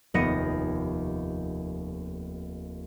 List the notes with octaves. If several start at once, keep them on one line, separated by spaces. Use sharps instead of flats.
F1 D#2 B3 A#6 C#7 D#7